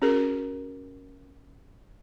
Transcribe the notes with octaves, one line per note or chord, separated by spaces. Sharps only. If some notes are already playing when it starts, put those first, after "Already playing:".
C#4 F#4 G#4 A#4